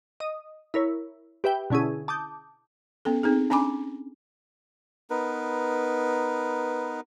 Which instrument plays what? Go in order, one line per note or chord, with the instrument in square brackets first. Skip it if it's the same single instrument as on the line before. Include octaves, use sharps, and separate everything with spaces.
[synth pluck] D#5 D#6
E4 A#4 C#5
G4 B4 E5 G5
B2 D3 C#4 E4 G#4
A5 D6 D#6 G6
[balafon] B3 C#4 A4
C4 D#4 G#4
C#4 D4 G#5 B5 D6
[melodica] B3 D#4 A#4 B4